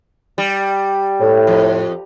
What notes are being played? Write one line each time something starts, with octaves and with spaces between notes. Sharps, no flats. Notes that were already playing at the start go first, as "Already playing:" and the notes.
G3
A2
F2